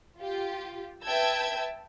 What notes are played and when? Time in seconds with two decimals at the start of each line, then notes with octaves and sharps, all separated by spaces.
0.19 F4 G4
1.05 B4 E5 G5 A5 E6 G#6